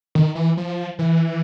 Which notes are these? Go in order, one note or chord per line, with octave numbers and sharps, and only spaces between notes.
D#3
E3
F3
E3